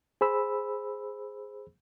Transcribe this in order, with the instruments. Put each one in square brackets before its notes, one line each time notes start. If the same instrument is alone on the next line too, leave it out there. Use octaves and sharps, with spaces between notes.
[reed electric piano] G#4 C5 B5 E6